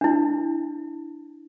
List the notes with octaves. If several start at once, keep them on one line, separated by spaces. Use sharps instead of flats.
D4 E4